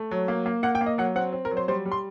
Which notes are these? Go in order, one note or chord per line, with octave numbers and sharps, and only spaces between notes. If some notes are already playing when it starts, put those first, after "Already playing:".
Already playing: A3
F#3
A#3
A#3
A#3 F#5
G5
A#3
D#5
F#3 F#5
C4 F#5
C4
A#4
F#3
C5
G3 C5
G3
C6